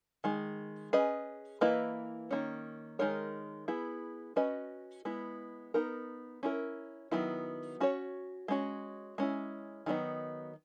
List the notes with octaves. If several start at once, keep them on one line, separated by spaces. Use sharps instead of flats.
D#3 G#3
C#4 G#4 B4 D#5
E3 A#3 E4 B4 D#5
D#3 A#3 C#4
D#3 G#3 D#4 A#4 C#5
B3 E4 G#4
C#4 F#4 B4 D#5
G#3 B3 E4
B3 D#4 A#4
C#4 E4 A#4
D#3 F#3 B3 E4
C#4 F#4 C#5
G#3 C#4 F#4
G#3 C#4 E4
D#3 F#3 B3 D#4